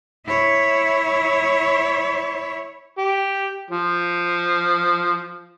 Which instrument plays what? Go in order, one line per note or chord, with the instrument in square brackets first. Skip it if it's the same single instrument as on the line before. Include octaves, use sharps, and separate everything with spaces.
[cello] E4 C#5
[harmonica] G4
F3